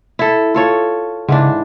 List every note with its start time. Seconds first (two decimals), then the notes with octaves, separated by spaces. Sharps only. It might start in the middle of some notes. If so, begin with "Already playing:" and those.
0.19 E4 A4
0.54 F4 A4 C#5
1.28 G#2 C#3 E3 D4